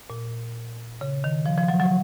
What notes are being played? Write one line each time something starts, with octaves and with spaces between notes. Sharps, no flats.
A#2
C#3
D#3
F3
F3
F#3
F#3